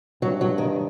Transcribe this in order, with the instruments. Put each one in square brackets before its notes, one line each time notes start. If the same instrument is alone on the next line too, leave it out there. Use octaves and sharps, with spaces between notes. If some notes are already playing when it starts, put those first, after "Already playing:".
[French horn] G2 [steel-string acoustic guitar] F#3
[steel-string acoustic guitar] F#3
D#3